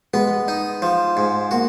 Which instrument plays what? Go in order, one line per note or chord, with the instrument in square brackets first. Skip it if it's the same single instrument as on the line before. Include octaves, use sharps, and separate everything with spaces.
[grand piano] G#3 [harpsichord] B3
[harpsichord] D#4
F3
G#2
[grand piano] A#3 [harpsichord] F#4